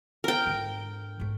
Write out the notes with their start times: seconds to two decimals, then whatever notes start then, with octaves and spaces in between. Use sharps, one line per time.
0.24 A#4 G5
0.46 G#2 D3
1.20 G#2 A3